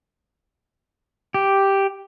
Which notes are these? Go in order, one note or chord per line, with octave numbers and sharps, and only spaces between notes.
G4